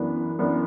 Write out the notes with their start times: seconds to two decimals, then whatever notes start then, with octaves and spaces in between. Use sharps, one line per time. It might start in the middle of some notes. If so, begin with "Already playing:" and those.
Already playing: F#2 E3 B3 D4
0.39 F#2 E3 B3 D4